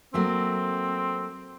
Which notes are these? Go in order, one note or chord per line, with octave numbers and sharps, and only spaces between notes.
F#3 A3 A#3 C4